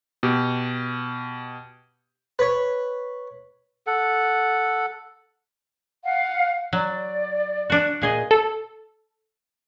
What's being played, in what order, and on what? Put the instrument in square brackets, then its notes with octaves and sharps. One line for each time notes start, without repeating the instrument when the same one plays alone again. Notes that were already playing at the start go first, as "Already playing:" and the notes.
[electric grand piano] B2 G4
[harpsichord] B4 C#5
[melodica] A4 F#5
[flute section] F5 F#5
[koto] F#3 [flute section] D5
[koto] D4 F#4
A#2 G#4 D#5
[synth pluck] A4